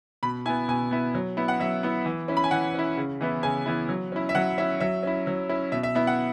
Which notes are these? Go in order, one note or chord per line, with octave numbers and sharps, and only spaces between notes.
B2 B5
B3 E4 G#5
B2 G#5
B3 E4
F#3
B3 E4
F#5
F#3 E5
B3 E4
E3
C#4 E4
B5
G#5
E3 F#5
C#4 E4
C#3
E3 B3 E4
C#3 G#5
E3 B3 E4
F#3
C#4 E4
E5
F#3 F#5
C#4 E4 E5
F#3 E5
C#4 E4
F#3
C#4 E4
B2 E5
E5
B3 E4 E5
F#5